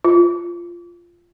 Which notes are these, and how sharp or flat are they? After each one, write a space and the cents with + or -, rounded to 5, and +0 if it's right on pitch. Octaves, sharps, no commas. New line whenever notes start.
F4 -10